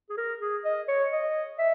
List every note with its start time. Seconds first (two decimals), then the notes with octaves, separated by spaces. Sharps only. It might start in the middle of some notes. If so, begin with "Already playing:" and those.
0.10 G#4
0.17 A#4
0.41 G#4
0.65 D#5
0.88 C#5
1.13 D#5
1.59 E5